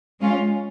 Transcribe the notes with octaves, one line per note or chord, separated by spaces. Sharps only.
G#3 C#4 F4